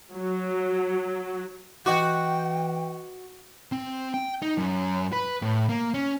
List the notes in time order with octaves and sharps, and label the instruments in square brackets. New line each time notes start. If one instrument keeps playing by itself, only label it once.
[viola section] F#3
[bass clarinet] E3 [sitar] F#4 [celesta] D#5 C#6 D6 [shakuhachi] G5
[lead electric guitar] C4
G5
D#4
F#2
B4
A2
A#3
C#4